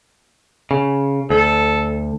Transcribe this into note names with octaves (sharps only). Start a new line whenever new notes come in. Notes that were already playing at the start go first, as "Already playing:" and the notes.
C#3
D2 A4